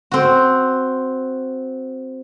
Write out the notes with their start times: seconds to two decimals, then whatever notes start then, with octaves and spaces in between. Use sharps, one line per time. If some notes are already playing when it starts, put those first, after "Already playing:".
0.11 C4 F#4